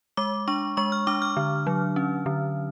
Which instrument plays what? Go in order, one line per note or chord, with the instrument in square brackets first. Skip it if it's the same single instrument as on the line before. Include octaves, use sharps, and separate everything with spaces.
[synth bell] G#3 D6
D4 C#6
G#3 C#6
F6
D4 D6
F6
D3
F#3
C#4
D3